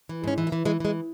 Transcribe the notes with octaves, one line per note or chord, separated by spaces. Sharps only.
E3
G#2 C#4
E3
A#3
E3
E3 G#3
E3 G#3